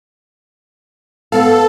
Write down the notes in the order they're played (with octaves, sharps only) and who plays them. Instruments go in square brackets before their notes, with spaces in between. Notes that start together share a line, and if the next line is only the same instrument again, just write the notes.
[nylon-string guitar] B3 F5 [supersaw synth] A4